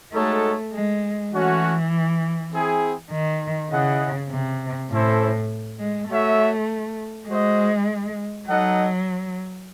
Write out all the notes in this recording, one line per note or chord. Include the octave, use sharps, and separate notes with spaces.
G#3 A3 D#4 F#4 A4 C#5
G#3
E3 A3 C#4 F#4 C#5 F#5
C4 E4 G#4
D#3
C#3 E4 G#4 D#5 F#5
C3
A2 C#4 E4 A4 C5
G#3
A3 F#4 C#5 E5
G#3 F#4 C5 D#5
F#3 D#4 A4 D#5 F#5